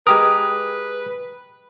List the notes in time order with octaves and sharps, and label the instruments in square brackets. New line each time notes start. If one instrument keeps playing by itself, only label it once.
[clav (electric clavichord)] G#3 G4 A#4 [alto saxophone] B4 [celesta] D#6